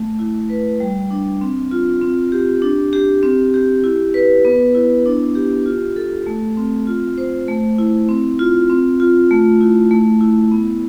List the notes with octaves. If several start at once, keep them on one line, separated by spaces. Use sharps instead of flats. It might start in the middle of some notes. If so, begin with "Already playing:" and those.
Already playing: A3
E4
B4
G3
D4
C4
F4
C4
G4
D4
G4
C4
G4
E4
B4
B3
E4
D4
G4
F4
A4
A3
C4
F4
C5
A3
E4
C4
F4
C4
F4
A3
E4
A3
E4
B3